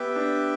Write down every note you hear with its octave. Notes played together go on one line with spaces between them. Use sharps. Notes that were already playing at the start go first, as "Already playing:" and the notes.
Already playing: B3 G4 B4 E5 G5
D4